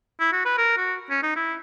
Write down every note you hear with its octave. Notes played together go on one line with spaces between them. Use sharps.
E4
F#4
B4
A#4
F#4
C#4
D#4
E4